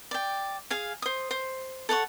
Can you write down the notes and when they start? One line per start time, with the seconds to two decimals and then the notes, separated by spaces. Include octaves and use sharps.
0.11 D5 G5
0.70 G#4 F5 G#5
1.02 C5 D#6
1.31 C5
1.89 A4 C#5 F#5 C#6